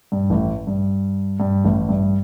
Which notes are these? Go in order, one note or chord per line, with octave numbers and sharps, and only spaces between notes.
G2
A1 A2
G2
G2
A1 A2
G2